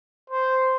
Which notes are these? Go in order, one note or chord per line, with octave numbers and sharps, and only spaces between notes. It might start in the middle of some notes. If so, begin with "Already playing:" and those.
C5